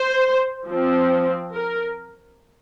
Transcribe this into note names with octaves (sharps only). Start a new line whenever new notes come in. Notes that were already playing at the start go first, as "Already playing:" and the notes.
Already playing: C5
F3 C4
A#4